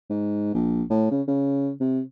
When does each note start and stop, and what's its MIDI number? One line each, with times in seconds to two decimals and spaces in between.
0.10 0.51 44
0.54 0.82 34
0.90 1.07 45
1.11 1.22 49
1.28 1.71 49
1.80 2.01 48